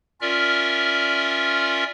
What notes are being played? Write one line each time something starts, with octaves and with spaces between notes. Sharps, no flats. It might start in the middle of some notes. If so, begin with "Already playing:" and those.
C#4 F4 A#4 D5 E5 F6